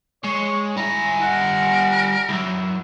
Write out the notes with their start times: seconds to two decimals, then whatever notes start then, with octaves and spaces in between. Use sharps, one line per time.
0.24 G#3 C#5 C#6
0.77 G3 E4 G#5 A#5
1.21 A#4 F#5
2.29 C#2 F#2 E4